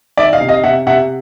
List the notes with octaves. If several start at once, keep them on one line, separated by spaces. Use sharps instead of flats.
D#3 D5 E5
D#5 F5
C3
D#5 F5
C3 E5 F#5
C3 E5 F#5